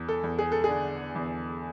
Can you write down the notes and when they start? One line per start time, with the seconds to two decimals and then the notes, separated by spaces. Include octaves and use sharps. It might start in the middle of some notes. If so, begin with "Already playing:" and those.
Already playing: E2
0.08 A4
0.23 E2
0.39 G#4
0.52 A4
0.64 D3 G#4
1.15 E2